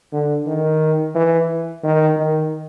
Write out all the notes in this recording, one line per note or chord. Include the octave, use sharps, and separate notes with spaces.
D3
D#3
E3
D#3
D#3